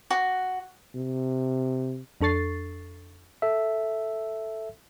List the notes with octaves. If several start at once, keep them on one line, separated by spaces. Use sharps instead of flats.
F#4
C3
F2 D4 A4 C#6 A6 C7
A4 E5